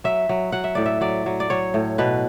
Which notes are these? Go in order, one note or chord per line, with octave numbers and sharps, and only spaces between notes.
F#3 E5
F#3
F#3 F#5
E5
A2 D5
E5
F#3 D5
F#3
D5
F#3 C#5
A2
B2 B4